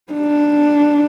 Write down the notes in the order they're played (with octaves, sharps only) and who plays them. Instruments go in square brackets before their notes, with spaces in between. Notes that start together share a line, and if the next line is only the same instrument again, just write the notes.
[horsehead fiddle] D4